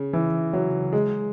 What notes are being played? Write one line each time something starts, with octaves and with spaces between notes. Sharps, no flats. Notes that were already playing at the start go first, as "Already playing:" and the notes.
Already playing: C#3
E3
F#3
G#3